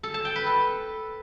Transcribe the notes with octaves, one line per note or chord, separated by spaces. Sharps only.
A4
A5
G5
B4
A4